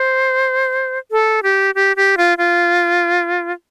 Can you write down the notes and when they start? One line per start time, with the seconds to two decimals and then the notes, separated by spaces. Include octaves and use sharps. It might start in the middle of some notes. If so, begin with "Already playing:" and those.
Already playing: C5
1.11 A4
1.43 G4
1.75 G4
1.96 G4
2.17 F4
2.38 F4